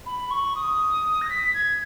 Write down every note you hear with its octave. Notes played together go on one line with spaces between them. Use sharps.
B5
C#6
D#6
A#6
B6
G#6